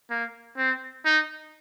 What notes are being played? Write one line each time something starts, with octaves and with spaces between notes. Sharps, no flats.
A#3
C4
D#4